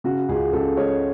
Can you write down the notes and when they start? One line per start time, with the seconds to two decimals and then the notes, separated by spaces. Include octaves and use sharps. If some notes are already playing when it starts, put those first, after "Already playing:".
0.04 C#3 F#4
0.29 C#2 G#4
0.53 C#2 A4
0.77 G#3 C#5